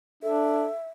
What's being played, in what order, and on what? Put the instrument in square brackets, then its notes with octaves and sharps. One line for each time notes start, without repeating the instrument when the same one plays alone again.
[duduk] D4 [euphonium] A4 [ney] E5